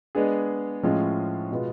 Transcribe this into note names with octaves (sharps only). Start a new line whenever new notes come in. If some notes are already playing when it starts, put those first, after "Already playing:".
G#3 B3 D4 G#4
A2 F3 G#3 C#4 F4
B2 G#3 B3 F4